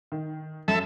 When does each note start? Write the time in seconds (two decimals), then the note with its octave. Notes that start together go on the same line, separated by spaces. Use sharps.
0.12 D#3
0.68 F#2 A4 E5